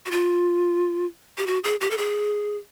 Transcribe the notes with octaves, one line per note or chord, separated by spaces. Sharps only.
F#4
F4
G4
F#4
G#4
G4
A4
G#4